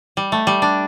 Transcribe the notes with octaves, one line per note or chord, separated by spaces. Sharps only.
G3
A3
G3
D4